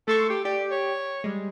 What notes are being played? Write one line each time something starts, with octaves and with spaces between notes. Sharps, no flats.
A3 A4 C6 C#6
G4
G4 D5
C#5
G3 G#3